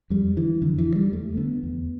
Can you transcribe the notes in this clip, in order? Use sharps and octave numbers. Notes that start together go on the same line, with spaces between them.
F2 G3
D3 E3
F2 D3
E3
D3
G3
E2 A3
D3 B3
E2